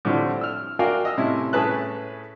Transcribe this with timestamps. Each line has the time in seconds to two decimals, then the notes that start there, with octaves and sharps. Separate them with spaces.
0.05 A2 D3 F3 G3 A3 C4
0.41 E6 F6
0.79 F#4 A#4 D5 F5 G5 G#5
1.05 D#5 E6
1.17 A2 C3 C#4 E4
1.53 A2 C#4 G#4 B4 A5 F#6